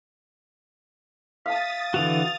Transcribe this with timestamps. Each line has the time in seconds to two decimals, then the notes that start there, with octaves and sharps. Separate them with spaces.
1.46 F5 A5 D#6 A6 B6
1.94 D3 E3 F#4 F7